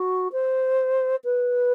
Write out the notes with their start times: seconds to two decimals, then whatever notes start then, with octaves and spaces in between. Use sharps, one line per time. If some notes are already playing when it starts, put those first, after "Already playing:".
Already playing: F#4
0.33 C5
1.24 B4